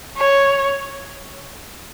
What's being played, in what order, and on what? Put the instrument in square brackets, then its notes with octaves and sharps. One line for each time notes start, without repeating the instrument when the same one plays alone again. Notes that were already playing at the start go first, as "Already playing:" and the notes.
[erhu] C#5